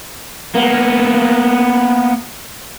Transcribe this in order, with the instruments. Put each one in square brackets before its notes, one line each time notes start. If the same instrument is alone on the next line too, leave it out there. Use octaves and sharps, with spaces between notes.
[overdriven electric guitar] A#3 B3